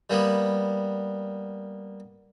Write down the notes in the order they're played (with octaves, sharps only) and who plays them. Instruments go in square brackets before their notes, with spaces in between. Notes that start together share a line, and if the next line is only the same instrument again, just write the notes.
[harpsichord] G3 A#3 B3